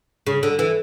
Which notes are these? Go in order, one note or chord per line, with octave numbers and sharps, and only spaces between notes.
C#3
D3
E3